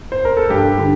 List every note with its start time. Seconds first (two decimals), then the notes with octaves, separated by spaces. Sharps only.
0.12 C5
0.25 A#4
0.37 A4
0.50 G2 G4
0.78 D3